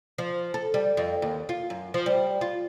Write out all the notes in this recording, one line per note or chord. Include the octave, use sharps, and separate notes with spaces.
F3
A4
G3
F2
D#2
F4
F#2
F3
G3
F4